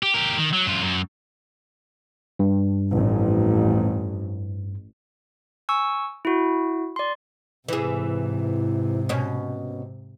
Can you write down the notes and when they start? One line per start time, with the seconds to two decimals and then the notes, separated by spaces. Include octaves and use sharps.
0.03 G4
0.14 G4 A#4
0.38 D#3
0.53 F#3
0.66 F#2 F4
0.83 F#2
2.39 G2
2.94 A1 F2
5.69 G#5 C#6 E6
6.25 E4 F#4
6.96 D5 C6
7.68 G#2 C3 E3 G#4
9.09 B2 C#4